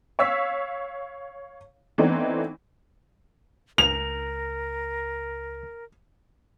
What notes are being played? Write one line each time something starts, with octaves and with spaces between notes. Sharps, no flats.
C#5 F5 E6 B6
E3 A3 B3 C4 D4 D#4
C#2 A#4 F7